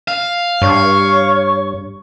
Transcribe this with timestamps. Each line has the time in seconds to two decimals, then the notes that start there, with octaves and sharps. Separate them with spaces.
0.08 F5
0.62 G2 C#5 C#6